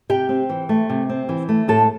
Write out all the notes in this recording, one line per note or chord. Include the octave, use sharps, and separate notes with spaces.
C3 G4 G5
C4
E3
A3
C3
C4
E3
A3
A2 A4 A5